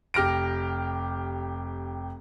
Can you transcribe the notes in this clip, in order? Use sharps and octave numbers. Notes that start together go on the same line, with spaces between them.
F1 G4 F6 A#6 D7